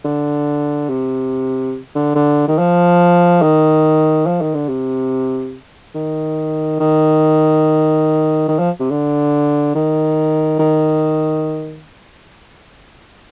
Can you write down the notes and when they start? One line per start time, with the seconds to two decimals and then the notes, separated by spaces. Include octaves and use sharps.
0.04 D3
0.89 C3
1.95 D3
2.15 D3
2.48 D#3
2.58 F3
3.42 D#3
4.27 F3
4.41 D#3
4.54 D3
4.68 C3
5.95 D#3
6.80 D#3
8.48 D#3
8.59 F3
8.80 C3
8.90 D3
9.75 D#3
10.59 D#3